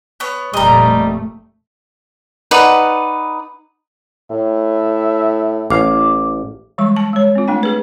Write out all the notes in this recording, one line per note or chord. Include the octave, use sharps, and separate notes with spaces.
B3 C#5
F1 A#2 G3 A3 D#5 A#5
D#4 B4 D5 F#5
A2 E5
A1 F5 D6
E3 G3 G#3 C#6
A5
G#3 C#5
C4 F4
A3 D4 G5
D4 G#4 B4